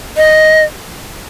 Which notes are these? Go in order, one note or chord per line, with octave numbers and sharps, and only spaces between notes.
D#5